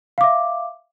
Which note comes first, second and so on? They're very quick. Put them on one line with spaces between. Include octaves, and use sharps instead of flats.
F5 D6 E5